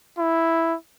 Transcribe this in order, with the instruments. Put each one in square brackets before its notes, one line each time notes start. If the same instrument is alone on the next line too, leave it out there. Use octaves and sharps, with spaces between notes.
[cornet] E4